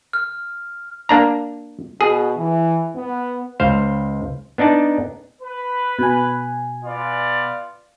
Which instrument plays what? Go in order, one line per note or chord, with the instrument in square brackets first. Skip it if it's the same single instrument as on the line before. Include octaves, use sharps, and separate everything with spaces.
[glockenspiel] F6
[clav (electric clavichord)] A#3 D4 A#5
[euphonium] B2 [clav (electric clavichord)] G#4
[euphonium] E3
B3
[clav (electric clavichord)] C#2 C5 F5
B3 D4 D#4 D5 A5
[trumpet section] B4
[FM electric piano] B2 G#5
[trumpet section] B3 F4 D5